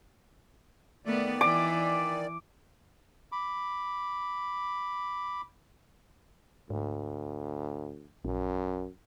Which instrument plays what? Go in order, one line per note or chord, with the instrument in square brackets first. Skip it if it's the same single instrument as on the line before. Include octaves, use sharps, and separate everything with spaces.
[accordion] D#3 D5 [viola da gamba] A3 B3
[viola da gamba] E3 [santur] D6
[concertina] B5 D6
[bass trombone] D2 [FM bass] G#2
[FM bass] A#1 [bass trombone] F#2